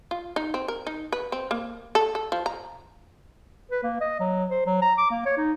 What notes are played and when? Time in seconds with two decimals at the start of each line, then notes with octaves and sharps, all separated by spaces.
0.11 F4
0.36 D#4
0.54 C4
0.68 A#4
0.87 D#4
1.12 B4
1.32 C4
1.51 A#3
1.95 A4
2.15 A4
2.32 F3
2.46 A#5
3.71 B4
3.83 A#3
4.00 D#5
4.20 F#3
4.50 C5
4.66 F#3
4.82 A#5
4.98 D6
5.11 A#3
5.26 C#5
5.37 D#4